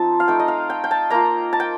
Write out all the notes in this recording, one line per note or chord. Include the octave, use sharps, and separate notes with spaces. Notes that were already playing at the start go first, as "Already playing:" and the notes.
Already playing: F3 C4 D#4 A5
F5
A3 D#4 G5
D#5
F5
G5
G5
A5
A#3 F4 A#5
A5
G5